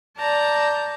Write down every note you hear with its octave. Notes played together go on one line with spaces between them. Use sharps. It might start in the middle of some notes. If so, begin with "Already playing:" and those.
D5 A5 A#5 G6